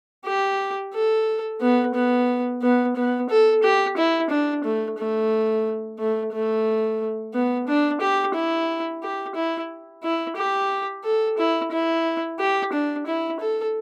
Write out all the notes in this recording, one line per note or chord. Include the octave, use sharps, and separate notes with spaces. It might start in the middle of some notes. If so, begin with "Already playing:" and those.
G4
A4
B3
B3
B3
B3
A4
G4
E4
D4
A3
A3
A3
A3
B3
D4
G4
E4
G4
E4
E4
G4
A4
E4
E4
G4
D4
E4
A4